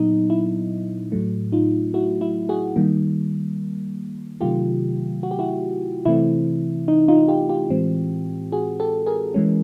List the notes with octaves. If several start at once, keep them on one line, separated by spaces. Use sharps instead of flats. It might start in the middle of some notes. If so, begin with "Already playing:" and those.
Already playing: A#2 F#3 B3 D#4
E4
A2 F#3 A3
D#4 F4
E4 F#4
E4
F#4 G#4
D#3 G3 A#3
C3 D#3 F#3 A3 F4 G4
F#4
G4
E4 F#4
C3 E3 A3 C4 E4
D#4
D#4 F4
F4 G4
F4 G4
A2 E3 G#3 C4
F#4 G#4
G4 A4
G#4 A#4
E3 G#3 C#4